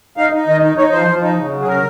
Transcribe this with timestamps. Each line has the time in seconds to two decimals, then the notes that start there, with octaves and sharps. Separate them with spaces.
0.17 D#4 F5
0.33 D#4
0.47 D#3 D#5
0.62 D#4
0.77 D#4 C#5
0.92 F3 C5
1.08 F3
1.22 D#4
1.37 C#3
1.52 F#3
1.62 G#4
1.67 C#3 A#4